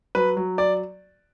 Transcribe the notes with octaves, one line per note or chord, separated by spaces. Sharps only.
F#3 B4
F#3
D5